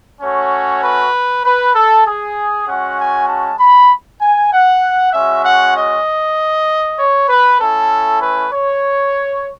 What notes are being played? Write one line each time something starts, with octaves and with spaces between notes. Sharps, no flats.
A3 C#4 F#4 C#5
B4
B4
A4
G#4
G#3 C#4 F#4 F#5
G#5
A5
B5
G#5
F#5
G#3 C#4 F#4 E5
F#5
D#5
C#5
B4
A3 C#4 E4 A4
B4
C#5